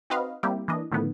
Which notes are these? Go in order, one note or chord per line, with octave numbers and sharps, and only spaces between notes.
C4 D#4 F#4 B4 D#5 F5
G3 A#3 C4 E4 G4
E3 A#3 D4 D#5
A2 D3 D#3 F3 A3 B3